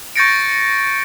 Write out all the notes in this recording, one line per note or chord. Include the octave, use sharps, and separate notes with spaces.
C#6 G6 A6 A#6 C#7 D7